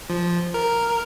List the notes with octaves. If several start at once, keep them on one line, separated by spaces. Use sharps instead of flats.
F3
A#4